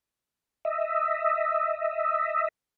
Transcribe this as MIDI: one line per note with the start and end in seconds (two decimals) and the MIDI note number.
0.65 2.48 75
0.65 2.48 76